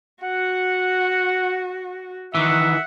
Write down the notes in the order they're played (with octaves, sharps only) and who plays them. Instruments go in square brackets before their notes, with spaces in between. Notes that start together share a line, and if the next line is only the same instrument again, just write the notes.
[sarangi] F#4 [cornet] F#5
[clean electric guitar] D#3 E3 [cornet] E5 [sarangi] F#5